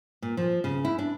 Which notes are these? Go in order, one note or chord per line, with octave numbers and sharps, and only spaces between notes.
A#2
F3
C#3
E4
D4